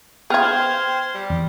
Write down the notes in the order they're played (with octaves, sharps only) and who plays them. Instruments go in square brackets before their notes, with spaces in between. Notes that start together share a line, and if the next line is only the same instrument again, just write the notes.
[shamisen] B3 F4 [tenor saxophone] G#4 [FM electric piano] G5 F6 G#6
[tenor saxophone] C5
G3
[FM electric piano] E2